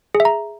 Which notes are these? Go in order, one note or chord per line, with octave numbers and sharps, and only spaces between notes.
G#4
E5
A#5